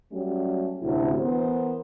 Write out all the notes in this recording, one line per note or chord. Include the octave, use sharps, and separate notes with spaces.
F#3 G3 A3 C#4
D2 A2 C3 C#4 E4
E3 B3 A#4 C5